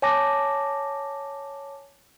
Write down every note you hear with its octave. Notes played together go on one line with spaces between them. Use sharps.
C#5 G#5 A5 D6 A#6